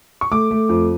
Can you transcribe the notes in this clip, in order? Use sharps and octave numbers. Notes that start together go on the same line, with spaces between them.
C#6
A3 D6
A3
F2